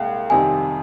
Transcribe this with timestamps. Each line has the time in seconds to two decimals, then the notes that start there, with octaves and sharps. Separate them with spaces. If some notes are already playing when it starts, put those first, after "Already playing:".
Already playing: C2 A#2 G#3 F5 G5
0.30 F2 C3 D#3 G3 C4 G#5